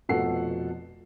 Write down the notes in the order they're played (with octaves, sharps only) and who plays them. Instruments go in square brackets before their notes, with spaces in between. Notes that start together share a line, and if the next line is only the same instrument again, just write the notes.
[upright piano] F1 B2 F3 A4 F#5 C7